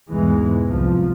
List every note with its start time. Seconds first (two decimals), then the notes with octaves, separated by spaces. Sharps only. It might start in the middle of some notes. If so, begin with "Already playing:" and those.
0.11 B1 E2 G#2 E3 G#3
0.67 C2 F3